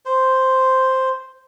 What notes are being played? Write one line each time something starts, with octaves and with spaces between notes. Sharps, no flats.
C5